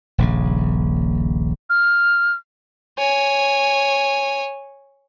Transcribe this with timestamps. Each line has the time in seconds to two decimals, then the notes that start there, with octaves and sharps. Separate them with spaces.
0.18 D#1 A#1 C#3
1.70 F6
2.98 C#5 G#5